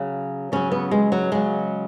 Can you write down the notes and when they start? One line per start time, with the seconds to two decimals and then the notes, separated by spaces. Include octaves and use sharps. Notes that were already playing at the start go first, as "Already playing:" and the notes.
Already playing: C#3 F#3
0.52 C#3 F#3 C#4
0.72 B3
0.91 G#3
1.12 F#3
1.32 C#3 F#3 G#3